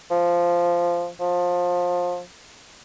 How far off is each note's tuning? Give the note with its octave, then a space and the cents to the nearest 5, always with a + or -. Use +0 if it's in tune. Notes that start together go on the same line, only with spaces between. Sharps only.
F3 -10
F3 +25